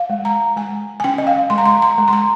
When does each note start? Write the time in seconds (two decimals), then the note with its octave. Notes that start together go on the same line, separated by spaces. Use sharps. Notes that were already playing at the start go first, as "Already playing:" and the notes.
Already playing: F5
0.10 G#3
0.25 A#5
0.56 G#3 G#5
1.00 G#5
1.04 C#4 G5
1.18 D#5
1.27 F5
1.50 G#3 C6
1.58 A#5
1.66 C6
1.82 A#5
1.98 G#3
2.08 C6
2.13 A#5